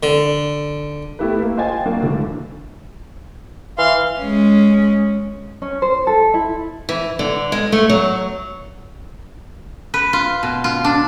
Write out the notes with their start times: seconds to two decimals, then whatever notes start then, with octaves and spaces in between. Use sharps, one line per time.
0.03 D3
1.19 A3 B3 E4 G4 B4
1.42 A#3
1.57 F4 C5 D#5 G5 G#5 A6
1.86 F#3 A#3 D4 F#4
2.02 D2 G#2 D3 E3
3.78 E3 F5 C6
4.20 G#3 C#4
5.62 C#4
5.82 C5
6.07 A4
6.34 E4
6.89 E3
7.19 D3
7.52 G#3
7.72 A3
7.90 F#3
9.94 B4
10.13 F4
10.43 B2
10.64 F4
10.84 D4